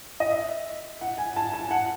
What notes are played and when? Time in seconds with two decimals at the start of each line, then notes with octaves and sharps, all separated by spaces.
0.20 D#5
0.30 E5
1.01 F#5
1.18 G#5
1.36 A5
1.53 A5
1.71 F#5